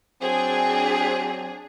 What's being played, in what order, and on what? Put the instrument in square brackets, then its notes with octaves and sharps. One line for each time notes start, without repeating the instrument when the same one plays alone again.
[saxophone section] F#3 C4 [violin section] D4 G#4